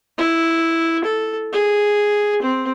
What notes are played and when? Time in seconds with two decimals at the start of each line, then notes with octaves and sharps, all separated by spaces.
0.18 E4
1.05 A4
1.52 G#4
2.42 C4